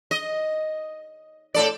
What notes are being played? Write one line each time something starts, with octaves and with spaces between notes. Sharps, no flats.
D#5
A2 A4 D5